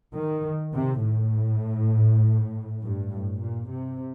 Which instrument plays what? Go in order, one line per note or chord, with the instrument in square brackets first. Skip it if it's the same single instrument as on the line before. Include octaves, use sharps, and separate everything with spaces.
[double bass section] D#3
C3
A2
G2
A2
A#2
C3